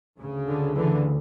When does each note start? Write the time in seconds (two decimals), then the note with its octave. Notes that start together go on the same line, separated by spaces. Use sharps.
0.18 D2 C#3
0.47 D3
0.76 D3 E3